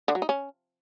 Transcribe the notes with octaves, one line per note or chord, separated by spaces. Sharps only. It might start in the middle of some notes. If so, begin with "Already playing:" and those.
D3
F#3
D#4
C#4